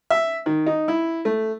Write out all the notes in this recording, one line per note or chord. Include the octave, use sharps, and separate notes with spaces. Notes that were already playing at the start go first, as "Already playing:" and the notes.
E5
D#3
D#4
E4
A3